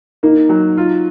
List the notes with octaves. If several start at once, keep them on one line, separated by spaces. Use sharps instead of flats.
A#3 D#4
F#3
F4